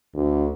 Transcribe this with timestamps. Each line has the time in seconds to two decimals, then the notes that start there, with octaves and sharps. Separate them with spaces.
0.14 D2